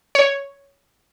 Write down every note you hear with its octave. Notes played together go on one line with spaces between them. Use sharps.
C#5